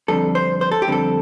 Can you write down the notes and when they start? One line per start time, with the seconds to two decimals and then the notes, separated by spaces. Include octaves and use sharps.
0.08 F2 D3 G3 C4 A4
0.35 C5
0.61 C5
0.72 A4
0.82 G4
0.87 F2 D3 G3 C4 A4